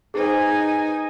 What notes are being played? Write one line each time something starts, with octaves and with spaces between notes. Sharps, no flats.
D#4 G#4 B4 C5 G#5